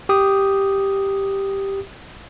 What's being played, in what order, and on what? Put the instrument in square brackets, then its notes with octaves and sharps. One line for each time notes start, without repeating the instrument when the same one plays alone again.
[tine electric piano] G4 D#6